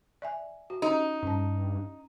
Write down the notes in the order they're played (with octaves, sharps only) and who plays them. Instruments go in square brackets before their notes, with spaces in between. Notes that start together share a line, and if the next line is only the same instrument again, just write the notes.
[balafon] D5 E5 G#5
F#4
[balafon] C#4 G4 [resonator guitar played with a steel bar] D#4
[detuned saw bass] G2 [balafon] C#4 A5